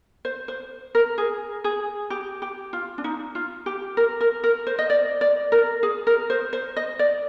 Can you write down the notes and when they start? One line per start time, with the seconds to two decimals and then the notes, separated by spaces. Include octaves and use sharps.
0.25 C5
0.48 C5
0.95 A#4
1.18 G#4
1.64 G#4
2.10 G4
2.42 G4
2.73 F4
2.98 D4
3.04 D#4
3.35 F4
3.66 G4
3.97 A#4
4.21 A#4
4.44 A#4
4.67 C5
4.79 D#5
4.90 D5
5.21 D5
5.52 A#4
5.83 G#4
6.07 A#4
6.30 C5
6.53 C5
6.76 D#5
6.99 D5